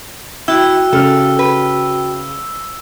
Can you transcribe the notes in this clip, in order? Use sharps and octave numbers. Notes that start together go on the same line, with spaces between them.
E4 F#4 G5 E6
C#3 A4 F6
B4